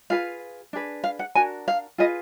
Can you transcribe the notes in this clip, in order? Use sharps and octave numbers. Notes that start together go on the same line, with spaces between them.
F4 G#4 B4 F5
D4 G#4 B4
F5
F#5
D4 F#4 A#4 G#5
F5
F4 G#4 B4 D#5